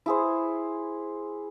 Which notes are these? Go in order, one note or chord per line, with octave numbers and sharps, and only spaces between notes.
E4 G#4 C5